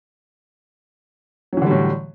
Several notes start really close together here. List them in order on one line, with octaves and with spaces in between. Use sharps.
F#3 E3 D3 G3 A2